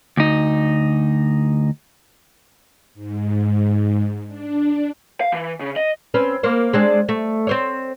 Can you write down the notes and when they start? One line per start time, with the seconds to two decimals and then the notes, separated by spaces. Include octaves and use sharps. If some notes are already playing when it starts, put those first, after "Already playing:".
0.17 D2 D#4
2.94 G#2
4.27 D4
5.21 F5
5.32 E3
5.61 C#3
5.76 D#5
6.14 C4 C#4 B4
6.43 A#3 C5
6.73 G#3 C4 D4
7.09 A3
7.47 C4 C5 C#5